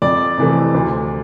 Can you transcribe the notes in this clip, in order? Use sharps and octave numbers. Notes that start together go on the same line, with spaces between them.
F2 D5
C3 E3 A3
D2